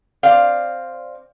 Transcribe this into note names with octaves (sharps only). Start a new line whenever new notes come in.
C4 D5 F5